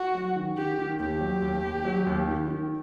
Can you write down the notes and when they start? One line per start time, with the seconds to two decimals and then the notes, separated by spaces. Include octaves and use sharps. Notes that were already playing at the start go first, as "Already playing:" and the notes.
Already playing: F#4
0.14 F#3
0.36 D#3
0.57 D#3 G4
0.78 D#3
1.00 D#2 G4
1.21 F#3
1.42 D#2
1.63 D#2
1.85 F#3
2.07 D#2
2.28 D#3
2.48 D#3